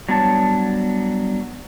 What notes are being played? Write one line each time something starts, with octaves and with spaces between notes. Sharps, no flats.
F#3 G3 B3 D4 C#5 A5